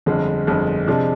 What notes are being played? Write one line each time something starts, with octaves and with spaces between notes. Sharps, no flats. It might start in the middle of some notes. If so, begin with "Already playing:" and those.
G1 F2 D3 G#3
G1 F2 D3 G#3
C3 F3 G#3 D4